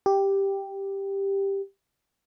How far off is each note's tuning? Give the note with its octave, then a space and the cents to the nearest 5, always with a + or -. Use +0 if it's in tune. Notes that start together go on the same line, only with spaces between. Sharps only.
G4 +5